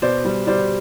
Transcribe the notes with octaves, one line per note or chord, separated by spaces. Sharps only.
B2 C5 D5
G3
G3 C5 D5